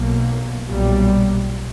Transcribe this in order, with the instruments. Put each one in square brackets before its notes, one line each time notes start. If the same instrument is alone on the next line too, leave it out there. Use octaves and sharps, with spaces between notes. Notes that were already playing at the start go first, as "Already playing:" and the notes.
Already playing: [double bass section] B1 B2 A#3
B1 A#2 G3